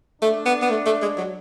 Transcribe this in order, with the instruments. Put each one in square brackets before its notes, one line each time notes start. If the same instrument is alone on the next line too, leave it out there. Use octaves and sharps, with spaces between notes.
[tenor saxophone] A3 [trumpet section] D4
[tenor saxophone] B3
B3
A3
A3
G#3
F#3